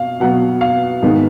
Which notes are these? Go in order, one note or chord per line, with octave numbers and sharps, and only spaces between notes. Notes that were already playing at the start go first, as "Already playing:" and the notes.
Already playing: B2 F5
B2 F#3 B3 F#5
F5
G#2 D#3 G#3 B3